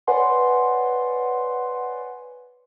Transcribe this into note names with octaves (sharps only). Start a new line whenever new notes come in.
B4 C#5 D5 F#5 G#5 C6